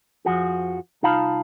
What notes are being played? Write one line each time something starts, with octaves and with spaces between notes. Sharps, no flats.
F2 F3 F#4 G#4
C2 D#4 F4 F5 A5 B5